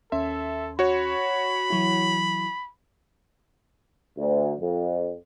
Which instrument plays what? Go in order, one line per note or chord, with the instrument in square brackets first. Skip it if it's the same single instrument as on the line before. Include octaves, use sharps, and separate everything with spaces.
[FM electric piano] D#2 C#4 C6 [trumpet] A4 [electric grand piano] E5
[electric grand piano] F#4 C#5 [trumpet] B5
[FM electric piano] E3 F#3 E4
[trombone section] D2
F2